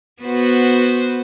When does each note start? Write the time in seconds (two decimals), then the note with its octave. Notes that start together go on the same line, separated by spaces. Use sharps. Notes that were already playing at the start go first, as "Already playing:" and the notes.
0.23 B3 F#4 C5